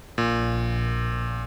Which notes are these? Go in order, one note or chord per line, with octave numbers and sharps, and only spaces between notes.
A#1 A#2